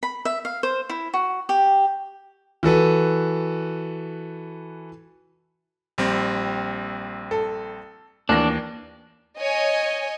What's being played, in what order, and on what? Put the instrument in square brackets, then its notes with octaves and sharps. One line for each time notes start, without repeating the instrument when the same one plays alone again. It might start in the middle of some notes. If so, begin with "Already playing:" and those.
[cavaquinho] B5
E5
F5
C5
E4
F#4
G4
[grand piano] E3 F#4 A4 B4
[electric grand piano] A#1 G3 C4
[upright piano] A4
[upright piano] D#2 E3 A#6 [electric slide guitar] D4
[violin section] C#5 D#5 G#5